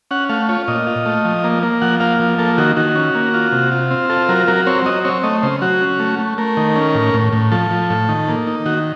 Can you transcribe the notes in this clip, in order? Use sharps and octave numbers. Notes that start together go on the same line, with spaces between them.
C#4 F#5
A3 F5
F4 C#5
A#2 D#5
F4
A3
F3
A#3
A#3
F3 F#5
A#3 F5
F3
A#3 A4
D#3 F#4
D#3 F#4
C#4
A#3
F4
C3
F4
C4
F4 A4
F#3 A#4
F#3 A#4
C4 C#5
F#3 D#5
C4 C#5
A3 D#5
C#3 C5
F#3 F#4
C#4
A3
A3
A3 A#4
D#3
C#4
A2
A2
A2
F3 A4
F3
A2
D#3
A#3
D#4
D#3 F#4